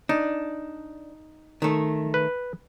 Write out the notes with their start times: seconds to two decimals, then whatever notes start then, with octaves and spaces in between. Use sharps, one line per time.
0.09 D4 D#4
1.62 D#3 A3
2.14 B4